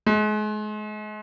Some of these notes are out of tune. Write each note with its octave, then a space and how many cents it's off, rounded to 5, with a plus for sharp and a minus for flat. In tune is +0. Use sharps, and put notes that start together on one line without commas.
G#3 +35